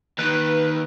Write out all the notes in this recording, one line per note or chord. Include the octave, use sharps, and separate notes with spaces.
D#2 D#3 B4